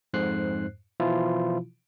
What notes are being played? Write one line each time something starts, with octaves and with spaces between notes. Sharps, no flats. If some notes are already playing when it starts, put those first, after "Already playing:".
F2 G#2 C5 F#6 C7
B2 E3 F3 E4 F4